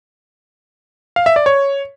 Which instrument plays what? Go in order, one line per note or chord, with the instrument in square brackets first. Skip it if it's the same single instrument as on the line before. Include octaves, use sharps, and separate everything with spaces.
[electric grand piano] F5
E5
D5
C#5